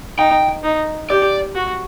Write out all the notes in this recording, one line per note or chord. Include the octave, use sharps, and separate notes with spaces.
D#4 G5
D#4
G4 D5
F#4